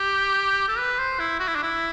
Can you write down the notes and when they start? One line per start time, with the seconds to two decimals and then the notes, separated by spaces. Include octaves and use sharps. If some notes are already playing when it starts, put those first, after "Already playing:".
Already playing: G4
0.68 A4
0.78 B4
0.98 C5
1.20 E4
1.39 F#4
1.48 E4
1.55 D4
1.63 E4